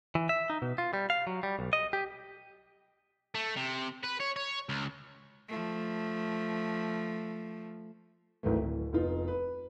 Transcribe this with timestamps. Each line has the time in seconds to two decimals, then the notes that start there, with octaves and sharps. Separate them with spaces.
0.15 E3
0.29 E5
0.50 D#4
0.62 B2
0.78 F4
0.94 G3
1.10 F5
1.27 F#3
1.43 G3
1.59 B1
1.73 D#5
1.93 G4
3.35 A3
3.57 C3
4.04 B4
4.20 C#5
4.36 C#5
4.69 C#2
5.49 F3 A3
8.43 G#1 D2 D#3 E3 A3
8.61 D1
8.93 F1 B3 D#4 F4
9.28 B4